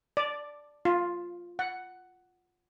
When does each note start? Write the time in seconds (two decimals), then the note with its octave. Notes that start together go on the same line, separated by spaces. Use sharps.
0.17 D5
0.85 F4
1.59 F#5